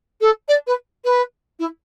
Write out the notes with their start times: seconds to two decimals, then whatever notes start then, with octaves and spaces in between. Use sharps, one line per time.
0.21 A4
0.48 D5
0.66 B4
1.04 B4
1.59 E4